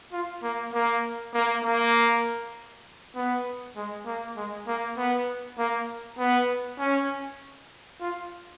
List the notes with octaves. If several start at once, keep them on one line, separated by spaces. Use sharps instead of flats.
F4
A#3
A#3
A#3
A#3
B3
G#3
A#3
G#3
A#3
B3
A#3
B3
C#4
F4